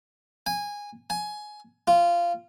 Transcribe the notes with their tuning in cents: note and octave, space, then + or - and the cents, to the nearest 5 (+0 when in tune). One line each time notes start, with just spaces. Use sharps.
G#5 -15
G#5 +15
F4 -15